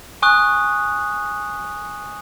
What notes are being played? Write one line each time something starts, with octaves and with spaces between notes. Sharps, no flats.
G#5 C#6 D#6 F#6